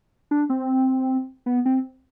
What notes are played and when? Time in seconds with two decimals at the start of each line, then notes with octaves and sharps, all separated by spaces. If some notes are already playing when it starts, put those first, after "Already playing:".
0.31 D4
0.50 C4
1.46 B3
1.66 C4